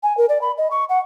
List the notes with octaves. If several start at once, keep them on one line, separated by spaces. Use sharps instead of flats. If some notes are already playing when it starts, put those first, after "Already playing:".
G#5
A#4
D5
B5
D#5
C#6
F#5